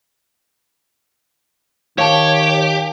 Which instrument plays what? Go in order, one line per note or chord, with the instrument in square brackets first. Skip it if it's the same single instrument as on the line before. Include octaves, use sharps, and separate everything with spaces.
[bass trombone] D#3 [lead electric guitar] G4 [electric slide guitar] C#5 [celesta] F5 A5